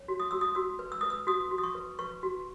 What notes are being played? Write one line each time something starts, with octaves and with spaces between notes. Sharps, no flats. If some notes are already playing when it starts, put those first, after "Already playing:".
Already playing: C#5
F#4
D#6
F#4 E6
D#6
F#4 E6
B4
E6
B4 D#6
E6
F#4 D#6
F#4
D#6
C#6
B4
B4 C#6
F#4